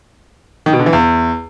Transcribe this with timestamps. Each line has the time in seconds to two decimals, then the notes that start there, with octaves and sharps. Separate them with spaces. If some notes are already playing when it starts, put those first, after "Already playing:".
0.66 D#3
0.73 B2
0.79 D3
0.86 E3
0.93 E2